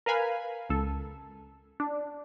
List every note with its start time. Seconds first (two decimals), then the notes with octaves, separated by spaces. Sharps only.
0.06 A#4 B4 F5 G#5 B5
0.70 C#2 A4
1.80 D4